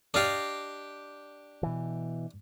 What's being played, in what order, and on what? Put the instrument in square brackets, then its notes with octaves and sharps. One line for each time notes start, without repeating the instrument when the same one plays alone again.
[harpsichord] D4 G4 [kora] D5 D#5 F5
[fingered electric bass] B2 E3